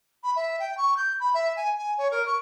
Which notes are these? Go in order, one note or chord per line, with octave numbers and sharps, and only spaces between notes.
B5
E5
G5
C#6
G6
B5
E5
G#5
G#5
C#5
A#4
C#6